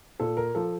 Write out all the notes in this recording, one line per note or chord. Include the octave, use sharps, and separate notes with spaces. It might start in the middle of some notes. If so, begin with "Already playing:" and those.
A#2 A4
A#4
F3 A4